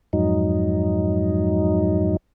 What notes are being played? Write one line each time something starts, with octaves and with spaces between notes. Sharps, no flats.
F2 G#2 F#3 D#4